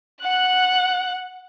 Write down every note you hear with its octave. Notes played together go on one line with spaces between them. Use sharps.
F#5 F#6